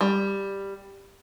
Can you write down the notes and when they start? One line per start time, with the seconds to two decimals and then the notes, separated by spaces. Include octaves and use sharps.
0.01 G3